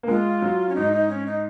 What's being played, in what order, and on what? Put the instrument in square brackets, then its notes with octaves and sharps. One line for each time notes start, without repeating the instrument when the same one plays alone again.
[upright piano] A#3
[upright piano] G#3 [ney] F4
[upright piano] F#3
[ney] C#4
[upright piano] G#2 [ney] D#4
[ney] D#4
C#4
D#4